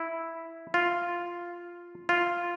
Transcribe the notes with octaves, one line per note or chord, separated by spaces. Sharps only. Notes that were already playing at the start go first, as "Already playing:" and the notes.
Already playing: E4
F4
F4